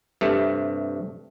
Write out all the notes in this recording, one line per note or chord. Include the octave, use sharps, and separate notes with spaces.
G2 C3 A3